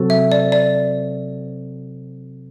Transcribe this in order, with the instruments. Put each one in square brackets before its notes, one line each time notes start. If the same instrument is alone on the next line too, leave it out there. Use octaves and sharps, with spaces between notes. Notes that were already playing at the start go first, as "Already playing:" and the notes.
Already playing: [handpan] C3 F#3 C4 F#4 A4
[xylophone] E5
D5
D5